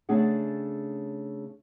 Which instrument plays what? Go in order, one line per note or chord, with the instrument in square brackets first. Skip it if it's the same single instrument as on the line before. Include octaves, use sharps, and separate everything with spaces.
[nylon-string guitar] C#3 A3 D4 G#4 F#5